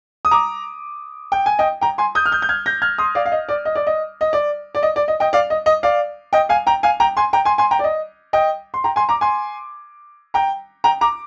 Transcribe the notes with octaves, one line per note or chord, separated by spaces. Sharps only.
D#6
A#5 D6
G5
G#5
D#5 G5
G5 A#5
G#5 C6
D#6 G6
F6
D#6 G6
G6
F6 G#6
G6 A#6
F6 G#6
C6 D#6
D5 F5
F5
D#5
D5
D#5
D5
D#5
D#5
D5
D5
D#5
D5
D#5
D#5 G5
D5 F5
D#5
D#5
D5 F5
D#5 G5
F5 G#5
G5 A#5
F5 G#5
G5 A#5
G#5 C6
G5 A#5
G#5 C6
G#5 C6
G5 A#5
D5
D#5
D#5 G5
C6
G5 A#5
G#5 C6
A#5 D6
G#5 C6
G5 A#5
G5 A#5
A#5 D6